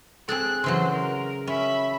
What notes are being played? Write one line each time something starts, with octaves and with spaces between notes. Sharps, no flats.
C4 G#4 A4 F#6
C#3 E3 F#3 C5 C6
A#4
C#4 E5 B5